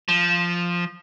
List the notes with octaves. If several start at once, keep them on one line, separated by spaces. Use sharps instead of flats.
F3